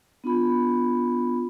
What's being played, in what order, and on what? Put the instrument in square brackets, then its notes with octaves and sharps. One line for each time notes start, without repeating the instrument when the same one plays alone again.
[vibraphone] B3 D4 F4 B5